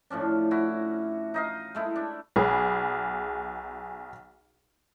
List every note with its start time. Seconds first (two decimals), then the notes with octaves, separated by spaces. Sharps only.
0.10 A2 F3 C#4 D4
0.51 E4 F#4
1.34 D#4 D#5 F5
1.75 G#3 A3 E4
1.96 D4
2.36 B1 G#4 B5